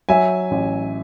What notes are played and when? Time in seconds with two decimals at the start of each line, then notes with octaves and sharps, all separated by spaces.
0.09 F#3 E5 G#5
0.51 A1